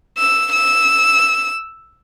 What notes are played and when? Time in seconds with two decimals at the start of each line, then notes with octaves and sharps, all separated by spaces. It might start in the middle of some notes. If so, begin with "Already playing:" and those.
0.18 E6
0.52 E6